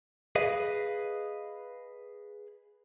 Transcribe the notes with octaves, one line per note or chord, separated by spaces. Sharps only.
G#4 B4 D#5 F5